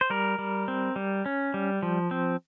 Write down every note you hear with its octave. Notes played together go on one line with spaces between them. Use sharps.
C5
G3 A#4
G3
C4
G3
C#4
G3
F3
C4